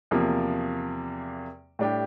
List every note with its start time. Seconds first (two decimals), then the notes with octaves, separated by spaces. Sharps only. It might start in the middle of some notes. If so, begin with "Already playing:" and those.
0.11 E2 C3 F3 A#3
1.79 A2 G3 D4 G4